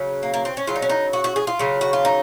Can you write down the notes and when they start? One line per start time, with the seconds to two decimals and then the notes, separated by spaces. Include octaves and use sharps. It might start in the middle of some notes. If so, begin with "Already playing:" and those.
Already playing: C#3 F#3
0.23 A#3
0.34 A#3
0.45 C4
0.57 C#4
0.67 C#3 F#3 F4
0.76 D#4
0.82 C#4
0.89 D#4
1.13 F#4
1.24 F#4
1.36 G#4
1.47 F4
1.59 C#3 F#3
1.81 F#4
1.93 F4
2.05 D#4